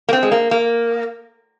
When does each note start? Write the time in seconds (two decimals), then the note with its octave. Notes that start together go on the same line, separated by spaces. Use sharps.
0.09 A#3
0.13 C4
0.23 G#3
0.32 A#3
0.51 A#3